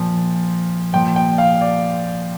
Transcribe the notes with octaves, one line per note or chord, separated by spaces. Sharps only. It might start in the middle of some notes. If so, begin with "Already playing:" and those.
Already playing: A#2 F3
A#2 F3 G5
G5
F5
D5